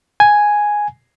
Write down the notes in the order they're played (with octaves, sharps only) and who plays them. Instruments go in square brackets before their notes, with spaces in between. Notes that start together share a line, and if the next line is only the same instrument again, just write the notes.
[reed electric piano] G#5